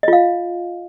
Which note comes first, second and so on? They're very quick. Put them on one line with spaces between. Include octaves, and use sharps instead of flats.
D#5 F4 F5